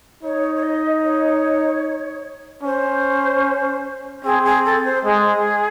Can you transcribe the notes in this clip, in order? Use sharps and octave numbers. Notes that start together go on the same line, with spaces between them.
D#4 C#5
C#5
D#5
C#5
C#4 C5
C4 G#4
G#4
A4
C5
G#3 G#4